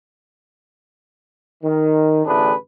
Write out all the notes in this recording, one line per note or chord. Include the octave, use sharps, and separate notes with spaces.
D#3
A1 A2 D3 D4 G#4 B4